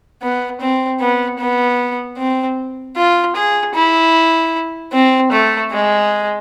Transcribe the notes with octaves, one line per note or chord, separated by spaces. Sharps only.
B3
C4
B3
B3
C4
F4
G#4
E4
C4
A3
G#3